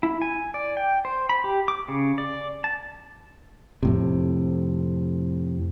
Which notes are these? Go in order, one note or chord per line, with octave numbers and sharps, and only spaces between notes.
E4
G#5
D5
G5
C5
B5
G4
D6
C#3
D5
A5
F2 A2 C3